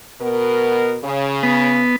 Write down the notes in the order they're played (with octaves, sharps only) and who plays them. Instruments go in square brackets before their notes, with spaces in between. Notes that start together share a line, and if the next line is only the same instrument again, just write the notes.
[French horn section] B2 B3 A#4
C#3
[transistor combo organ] B3